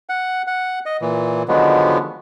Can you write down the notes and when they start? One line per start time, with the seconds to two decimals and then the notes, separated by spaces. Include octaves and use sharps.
0.09 F#5
0.47 F#5
0.86 D#5
1.01 A#2 E3
1.48 D3 D#3 F3 F#3 G#3 B3